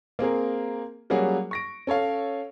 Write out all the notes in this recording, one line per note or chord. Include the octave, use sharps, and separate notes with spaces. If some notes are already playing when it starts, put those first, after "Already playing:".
A#3 C4 G#4 A#4
F#3 G3 A#3 C#4 F#4 G#4
C#6 A#6 D7
C#4 A4 C#5 F5